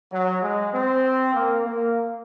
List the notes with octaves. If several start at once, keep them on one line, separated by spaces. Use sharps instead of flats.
F#3
G#3
C4
A#3
A#3